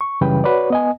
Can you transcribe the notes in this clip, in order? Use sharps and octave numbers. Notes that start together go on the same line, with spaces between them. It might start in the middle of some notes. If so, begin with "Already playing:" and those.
C#6
F#2 C#3 E3 G3 B4 G5
F#4 B4 C#5 D5
B3 D#5 G#5